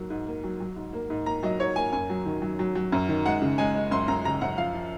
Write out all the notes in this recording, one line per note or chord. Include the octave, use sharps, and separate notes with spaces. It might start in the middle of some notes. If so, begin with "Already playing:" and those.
Already playing: G#2 F#3 A#3
G#2
A#3
F#3
F#3
G#2
A#3
G#2
A#3 A#5
F#3 D#5
G#2 C#5
A#3 G#5
F#2 G#5
F#3
D#3
F#3
F#3
F#3
F#2
D#3
G#3 F#5
C#3
G#3 G#5
G#3
F#2 C6
F#2 A#5
C#3 A#5
F#2 F#5
F3 F5
F3